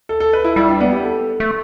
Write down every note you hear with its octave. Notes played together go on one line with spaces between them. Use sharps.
A4
A4
B4
E4
G3 E4
D4
B3
G4
A4
A3